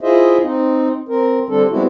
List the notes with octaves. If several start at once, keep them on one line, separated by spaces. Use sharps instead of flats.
E4 F4 G#4 C5 D#5 E5
C4 D#4
C4 A#4
D3 G3 C4 D4 A4
G3 G#3 B3 C4 E4 F#4